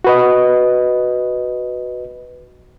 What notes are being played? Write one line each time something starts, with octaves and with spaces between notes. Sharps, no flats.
F#4 B4 D#5